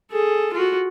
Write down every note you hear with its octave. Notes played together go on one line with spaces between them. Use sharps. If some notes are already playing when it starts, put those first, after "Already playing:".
G#4 A4
F4 F#4